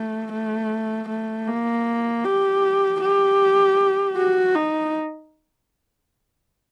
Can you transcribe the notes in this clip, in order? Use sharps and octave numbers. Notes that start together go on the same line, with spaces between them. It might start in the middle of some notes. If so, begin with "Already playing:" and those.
Already playing: A3
A3
A3
A#3
G4
G4
F#4
D#4